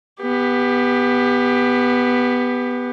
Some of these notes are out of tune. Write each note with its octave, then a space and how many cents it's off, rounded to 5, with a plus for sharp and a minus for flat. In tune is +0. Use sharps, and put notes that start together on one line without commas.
B3 +0 G4 +25